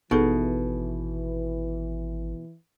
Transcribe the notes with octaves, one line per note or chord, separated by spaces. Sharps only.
G#1 B2 E3 D#4 G#4 A4